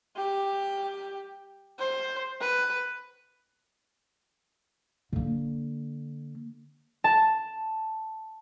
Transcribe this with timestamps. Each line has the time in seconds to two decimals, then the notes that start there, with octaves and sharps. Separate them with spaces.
0.16 G4
1.79 C5
2.41 B4
5.13 D3 A#3
7.04 A5